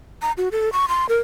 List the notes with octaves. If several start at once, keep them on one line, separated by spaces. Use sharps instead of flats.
A#5
F#4
A4
C#6
C6
A#4